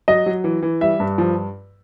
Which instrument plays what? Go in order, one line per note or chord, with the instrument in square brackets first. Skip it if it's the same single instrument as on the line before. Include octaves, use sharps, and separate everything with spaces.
[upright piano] F#3 [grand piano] D#5
[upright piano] F#3
E3
E3
[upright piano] G3 [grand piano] E5
[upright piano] G2
F3